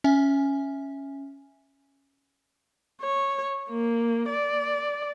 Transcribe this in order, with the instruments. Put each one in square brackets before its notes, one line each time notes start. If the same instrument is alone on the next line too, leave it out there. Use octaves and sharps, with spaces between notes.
[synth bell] C#4 E5 G#5
[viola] C#5
A#3
D5